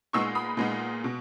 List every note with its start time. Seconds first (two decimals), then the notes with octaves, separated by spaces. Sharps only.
0.13 A#2 G#3 B3 D#4 C#6 E6
0.35 B5 D#6
0.57 A#2 G#3 B3 D#4
1.04 B2